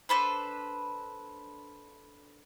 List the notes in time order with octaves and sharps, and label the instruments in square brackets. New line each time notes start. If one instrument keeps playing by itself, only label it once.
[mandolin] D4 A4 B4 C5